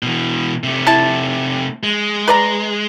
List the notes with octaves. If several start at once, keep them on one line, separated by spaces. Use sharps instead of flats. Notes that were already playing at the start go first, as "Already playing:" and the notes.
B2 E3
C3 A3
E4 A5
G#3
B4 D5 A#5